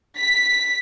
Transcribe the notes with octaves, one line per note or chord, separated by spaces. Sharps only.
B6